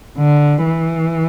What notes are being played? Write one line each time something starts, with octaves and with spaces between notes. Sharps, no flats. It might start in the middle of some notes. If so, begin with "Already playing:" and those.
D3
E3